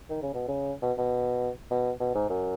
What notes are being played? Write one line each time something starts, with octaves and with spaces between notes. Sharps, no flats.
D#3
C#3
B2
C#3
B2
B2
B2
B2
G#2
F#2